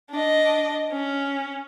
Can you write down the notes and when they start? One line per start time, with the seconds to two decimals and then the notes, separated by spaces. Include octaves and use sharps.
0.11 D4 D#5
0.92 C#4